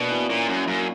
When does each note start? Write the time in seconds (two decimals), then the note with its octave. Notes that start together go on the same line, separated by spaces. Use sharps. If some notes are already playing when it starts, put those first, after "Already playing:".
Already playing: B2 A#3 D4
0.10 E3
0.30 A#2 C#4
0.48 F#2 C#4
0.67 F#2 A#3